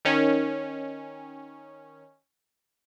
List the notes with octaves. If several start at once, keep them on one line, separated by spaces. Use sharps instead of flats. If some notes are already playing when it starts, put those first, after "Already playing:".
D#3 C#4